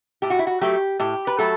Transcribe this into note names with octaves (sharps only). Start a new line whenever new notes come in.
A2 G4
F#4
E4
F#4
F#3 A3 G4
A2 G4
B4
F#3 A3 A4